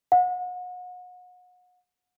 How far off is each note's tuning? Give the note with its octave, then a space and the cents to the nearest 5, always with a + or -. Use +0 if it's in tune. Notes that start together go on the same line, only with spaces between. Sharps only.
F#5 -35